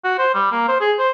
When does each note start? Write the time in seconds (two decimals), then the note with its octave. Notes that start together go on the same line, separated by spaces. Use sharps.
0.04 F#4
0.19 C5
0.34 G3
0.52 A#3
0.68 C5
0.81 G#4
0.98 C5